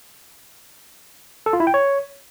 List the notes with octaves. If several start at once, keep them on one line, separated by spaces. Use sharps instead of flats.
A4
F4
E4
G5
C#5